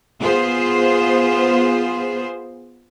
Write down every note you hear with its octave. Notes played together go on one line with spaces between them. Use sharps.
B3 F4 G#4 C5